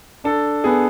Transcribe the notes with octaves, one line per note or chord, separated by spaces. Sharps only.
D4 A4
B3 G#4